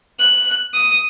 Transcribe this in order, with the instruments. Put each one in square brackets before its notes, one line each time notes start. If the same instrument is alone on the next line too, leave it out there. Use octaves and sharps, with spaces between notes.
[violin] F#6
D#6